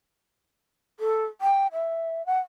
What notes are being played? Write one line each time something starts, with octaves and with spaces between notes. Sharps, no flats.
A4
G5
E5
F#5